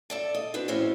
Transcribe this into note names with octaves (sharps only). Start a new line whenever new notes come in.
A4 D5 E5
D#5
C4 D4 F#4 B4
E2 A2 C#4 F#4 C5 E5